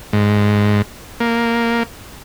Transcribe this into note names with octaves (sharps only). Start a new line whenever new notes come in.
G#2
A#3